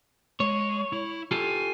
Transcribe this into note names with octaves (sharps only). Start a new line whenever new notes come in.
G#3 C#5
E4
F4 G4 A4 G#5